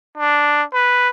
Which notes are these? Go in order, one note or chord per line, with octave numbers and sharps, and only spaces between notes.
D4
B4